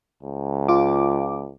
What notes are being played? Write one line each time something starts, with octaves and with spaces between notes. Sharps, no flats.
C#2
F4 D6